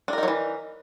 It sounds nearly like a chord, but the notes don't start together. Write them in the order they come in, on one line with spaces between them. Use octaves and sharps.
D4 A#4 D#4 F#3 E3